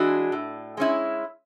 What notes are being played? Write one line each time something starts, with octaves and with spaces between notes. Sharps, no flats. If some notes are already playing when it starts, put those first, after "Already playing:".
Already playing: E3 G#3 D4 F#4
A2
G#3 C#4 E4